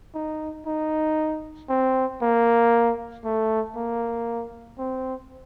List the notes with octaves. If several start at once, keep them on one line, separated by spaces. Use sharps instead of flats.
D#4
D#4
C4
A#3
A3
A#3
C4